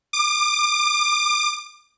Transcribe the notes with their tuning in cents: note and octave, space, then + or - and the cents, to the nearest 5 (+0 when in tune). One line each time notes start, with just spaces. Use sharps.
D6 +35